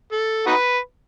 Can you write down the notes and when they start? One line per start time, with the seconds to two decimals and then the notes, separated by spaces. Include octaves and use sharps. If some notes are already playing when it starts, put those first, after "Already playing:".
0.12 A4
0.47 D#4 F#4 B4